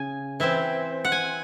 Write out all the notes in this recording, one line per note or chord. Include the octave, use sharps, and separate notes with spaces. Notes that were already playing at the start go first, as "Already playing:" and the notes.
Already playing: C#3 G#5
E3 C4 E5
F#5
G#5